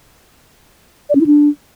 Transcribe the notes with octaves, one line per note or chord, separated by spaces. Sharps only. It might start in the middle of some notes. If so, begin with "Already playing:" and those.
D5
C#4
E4
D4